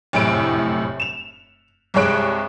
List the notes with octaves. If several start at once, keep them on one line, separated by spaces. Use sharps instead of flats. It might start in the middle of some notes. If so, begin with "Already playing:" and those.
F1 A#1 F#2 A2 E4 D7
E7 F7
C2 G2 G#3 C#5 F#6 D7